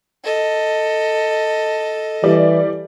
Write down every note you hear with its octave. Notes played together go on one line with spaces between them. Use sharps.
A4 D#5
E3 G3 D5